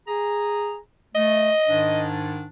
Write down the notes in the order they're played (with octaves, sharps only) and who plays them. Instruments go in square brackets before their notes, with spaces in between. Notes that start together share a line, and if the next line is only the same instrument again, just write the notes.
[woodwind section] G#4 A#5
[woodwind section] A3 [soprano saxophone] D#5
[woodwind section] G#2 D#3 D4